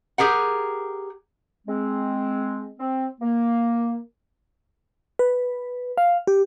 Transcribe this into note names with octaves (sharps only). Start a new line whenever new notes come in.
G4 G#4 A#4 F#5
G#3 C4
C4
A#3
B4
F5
G4